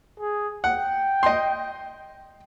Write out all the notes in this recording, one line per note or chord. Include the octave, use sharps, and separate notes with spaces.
G#4
F#5 G5
D#5 C6